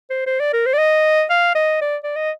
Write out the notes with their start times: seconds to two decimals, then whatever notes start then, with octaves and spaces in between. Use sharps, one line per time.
0.10 C5
0.27 C5
0.40 D5
0.53 A#4
0.66 C5
0.73 D5
0.78 D#5
1.30 F5
1.55 D#5
1.81 D5
2.03 D5
2.16 D#5